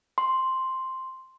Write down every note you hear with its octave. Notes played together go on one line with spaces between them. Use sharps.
C6